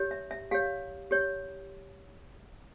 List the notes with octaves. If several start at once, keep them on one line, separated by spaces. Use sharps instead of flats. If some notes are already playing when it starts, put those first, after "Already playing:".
Already playing: G4 C#5
E5
E5
G4 C#5 F5
G4 C#5